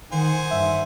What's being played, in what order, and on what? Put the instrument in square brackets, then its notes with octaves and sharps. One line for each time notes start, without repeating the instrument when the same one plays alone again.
[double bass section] D#3 [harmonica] C5 F#5 G#5
[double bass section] G2 [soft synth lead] E5